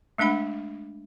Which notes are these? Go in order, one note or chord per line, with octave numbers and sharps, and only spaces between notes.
G#3 A3 D4 F#5 B5